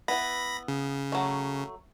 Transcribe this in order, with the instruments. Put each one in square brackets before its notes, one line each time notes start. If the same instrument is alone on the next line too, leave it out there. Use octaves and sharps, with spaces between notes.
[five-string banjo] B3 E4 [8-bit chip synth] B5 A#6
[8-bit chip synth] C#3
[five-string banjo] F#3 A3